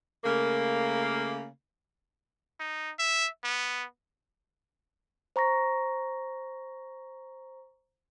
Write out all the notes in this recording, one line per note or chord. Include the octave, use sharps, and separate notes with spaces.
C#3 A3 A#3
D#4
E5
B3
C5 A#5 C#6 A#6